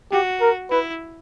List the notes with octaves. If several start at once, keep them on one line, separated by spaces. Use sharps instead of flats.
F#4 G4
A#4
E4 B4